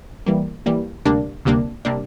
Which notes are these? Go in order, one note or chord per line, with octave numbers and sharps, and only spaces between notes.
E3 G3 A#3
E3 G3 A#3
D2 C3 G3 A#3 D4
D2 C3 G3 A#3 D4
C3 G3 A#3 D4